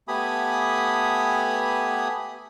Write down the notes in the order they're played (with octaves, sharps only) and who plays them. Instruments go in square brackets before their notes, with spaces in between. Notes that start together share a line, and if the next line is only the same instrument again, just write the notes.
[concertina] A3 B3 G4 G#5 B5 D#6